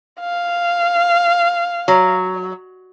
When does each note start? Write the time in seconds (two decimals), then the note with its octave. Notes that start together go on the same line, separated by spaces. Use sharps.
0.20 F5
1.88 F#3